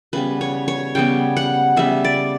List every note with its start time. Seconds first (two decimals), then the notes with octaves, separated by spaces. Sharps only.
0.13 C#3 G3 B3 B4
0.41 C#5
0.68 C#5
0.95 C#3 G3 B3 G5
1.37 F#5
1.76 C#3 G3 B3 E5
2.04 D5